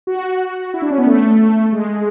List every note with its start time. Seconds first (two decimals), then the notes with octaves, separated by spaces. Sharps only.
0.07 F#4
0.74 E4
0.82 D4
0.90 C#4
0.98 B3
1.06 A3
1.72 G#3